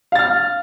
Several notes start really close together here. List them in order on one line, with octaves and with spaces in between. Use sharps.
F5 A6 F6